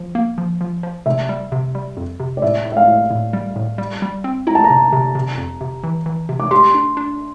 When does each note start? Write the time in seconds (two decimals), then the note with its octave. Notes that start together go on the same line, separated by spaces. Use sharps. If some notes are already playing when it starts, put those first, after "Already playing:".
Already playing: F3
0.15 A#3
0.38 F3
0.61 F3
0.83 F3
1.06 C3 E5
1.29 G3
1.52 C3
1.75 G3
1.97 F2
2.20 C3
2.37 D5
2.42 A2 E5
2.65 A2
2.72 E5
2.77 F5
2.88 A2
3.11 A2
3.33 G3
3.56 A2
3.78 G3
4.02 G3
4.24 C4
4.47 E4 A#5
4.55 A5
4.64 A#5
4.70 C3
4.93 C3
5.15 C3
5.38 F2
5.61 C3
5.83 E3
6.06 E3
6.29 C3
6.40 D6
6.51 G4 C6
6.75 D4
6.97 D4